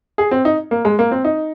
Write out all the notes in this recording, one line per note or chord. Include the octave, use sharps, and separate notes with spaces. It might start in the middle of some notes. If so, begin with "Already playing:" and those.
G#4
C4
D#4
A#3
G#3
A#3
C4
D#4